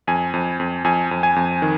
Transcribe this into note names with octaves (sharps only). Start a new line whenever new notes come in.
F2 G#5
F2
F2
F2 G#5
F2
G#5
F2
D#3